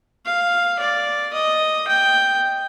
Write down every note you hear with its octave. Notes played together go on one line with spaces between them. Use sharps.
F5
D5
D#5
G5